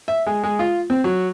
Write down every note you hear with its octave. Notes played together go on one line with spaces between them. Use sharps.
E5
G#3
G#3
F4
C4
F#3